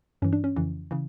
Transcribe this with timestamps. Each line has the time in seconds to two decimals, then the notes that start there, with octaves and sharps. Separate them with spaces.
0.22 G2 E3 C#4
0.33 D4
0.44 C#4
0.56 F2 C#3 E3
0.91 C#3 E3